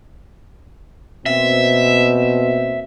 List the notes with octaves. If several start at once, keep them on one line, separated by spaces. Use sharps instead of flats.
B2 A#3 C4 E5